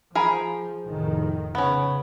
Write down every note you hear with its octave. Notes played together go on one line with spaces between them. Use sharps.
F3 G#4 A#4 B5
F1 A2 D#3
C#3 B3 C#4